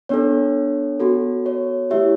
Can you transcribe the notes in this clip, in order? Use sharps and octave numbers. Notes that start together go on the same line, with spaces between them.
B3 D4 A4 C#5
B3 F#4 A4
C#5
A3 E4 G4 C#5 E5